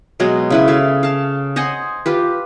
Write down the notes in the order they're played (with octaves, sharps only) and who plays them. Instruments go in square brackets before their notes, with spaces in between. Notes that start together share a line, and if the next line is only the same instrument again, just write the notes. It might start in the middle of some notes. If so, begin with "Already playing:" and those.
[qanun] B2 F#3 G#3 D#5
C#3 E4 B4
A4 E5 F5
F5 A5
C5 D#5 F#5 G#5
F4 G4 B4